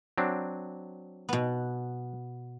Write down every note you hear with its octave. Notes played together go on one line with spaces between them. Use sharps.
F#3 C4 D4
B2 B3